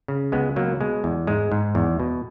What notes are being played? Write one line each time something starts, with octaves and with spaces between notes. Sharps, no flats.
C#3
C#2 G#3 B3
B2 F#3 A#3
B2 G#3
E2
G#2 G#3
G#2
E2
B2